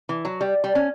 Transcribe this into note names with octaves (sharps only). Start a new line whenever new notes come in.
E3
F#3
G3
G3
C#4